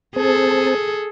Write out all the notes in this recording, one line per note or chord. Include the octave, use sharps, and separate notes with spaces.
C4 G#4 A4 C5 A5